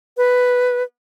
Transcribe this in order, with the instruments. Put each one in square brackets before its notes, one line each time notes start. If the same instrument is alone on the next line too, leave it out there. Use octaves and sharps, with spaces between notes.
[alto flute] B4